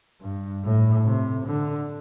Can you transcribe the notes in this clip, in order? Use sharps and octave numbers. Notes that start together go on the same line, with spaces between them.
G2
A2
C3
D3